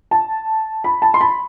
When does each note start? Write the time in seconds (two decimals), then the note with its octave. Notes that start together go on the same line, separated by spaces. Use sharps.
0.11 A5
0.84 B5
1.02 A5
1.14 C6
1.21 B5